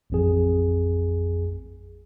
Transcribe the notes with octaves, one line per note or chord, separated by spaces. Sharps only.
A1 F2 G#4